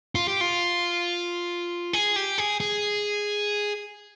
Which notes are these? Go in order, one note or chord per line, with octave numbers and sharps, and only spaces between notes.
F4
G4
F4
G#4
G4
G#4
G#4